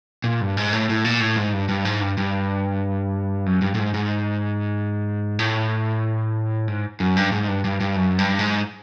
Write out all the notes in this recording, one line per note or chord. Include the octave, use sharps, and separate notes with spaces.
A#2
G2
G#2
A2
A2
A#2
A2
G#2
G2
G2
G#2
G2
G2
F#2
G2
A2
G#2
G#2
A2
G#2
F#2
G2
G#2
G2
G2
G2
F#2
G2
G#2